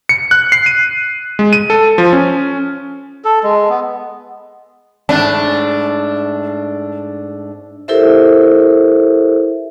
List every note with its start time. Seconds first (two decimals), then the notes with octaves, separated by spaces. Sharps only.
0.09 C#7
0.31 F#6
0.52 C7
0.66 D#7
1.39 G#3
1.53 D#7
1.70 A4
1.98 F3
2.13 C#4
3.25 A4
3.43 G#3
3.69 B3
5.09 G#2 A3 D4
7.88 E4 G4 A4 A#4 C5 E5